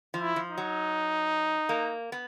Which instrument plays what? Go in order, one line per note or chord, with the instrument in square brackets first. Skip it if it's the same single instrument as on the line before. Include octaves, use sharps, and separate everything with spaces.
[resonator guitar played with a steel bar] F3
[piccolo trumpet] E4
[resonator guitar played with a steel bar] F3
[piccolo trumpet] D#4
[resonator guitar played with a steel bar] F#3
A#3
B3